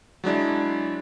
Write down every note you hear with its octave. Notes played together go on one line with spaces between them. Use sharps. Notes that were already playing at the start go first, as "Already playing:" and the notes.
F#3 G#3 D4 E4